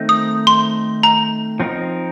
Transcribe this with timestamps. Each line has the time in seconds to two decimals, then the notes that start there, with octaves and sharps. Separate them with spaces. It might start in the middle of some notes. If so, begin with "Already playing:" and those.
Already playing: D#3 A3 C4 D#4
0.09 D#6
0.47 C6
1.03 A#5
1.60 F3 C4 D#4 A#4